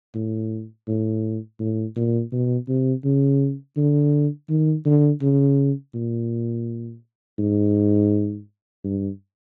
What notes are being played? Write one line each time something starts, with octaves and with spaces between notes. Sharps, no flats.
A2
A2
A2
A#2
B2
C3
C#3
D3
D#3
D3
C#3
A#2
G#2
G2